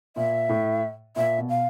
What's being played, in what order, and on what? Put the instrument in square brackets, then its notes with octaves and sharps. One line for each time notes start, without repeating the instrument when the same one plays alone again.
[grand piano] A#2 [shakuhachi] E5
[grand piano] A2
[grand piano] A#2 [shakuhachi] E5
[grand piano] B2
[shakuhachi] F5